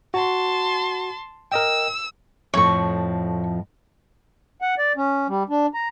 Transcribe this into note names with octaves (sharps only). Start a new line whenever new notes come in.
F#4 A5 C6
A#4 D#5 G5 E6
F2 A2 F3 C#5 C#6
F#5
D5
C#4
G3
D4
A#5